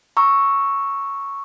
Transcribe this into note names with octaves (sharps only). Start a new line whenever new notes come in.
A#5 C#6 E6